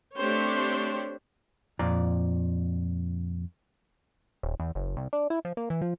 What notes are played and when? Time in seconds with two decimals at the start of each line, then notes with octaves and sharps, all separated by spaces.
0.18 A3 C4 D4 G4 C5 C#5
1.79 F2 A#2 D5 A#5
4.43 D#1
4.60 E2
4.75 F#1
4.97 C2
5.13 D4
5.30 E4
5.45 F3
5.57 A#3
5.70 E3
5.82 F3